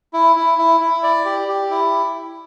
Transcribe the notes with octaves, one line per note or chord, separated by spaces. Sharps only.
E4
E4
E4
E4
D5
G4
G4
E4